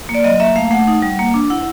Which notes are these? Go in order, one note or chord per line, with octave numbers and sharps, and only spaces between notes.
A#3
D5
F#3 D#5
A#3 E5
A3 F5
A3 F#5
D#4
G3
A#3
D4
E4 F#5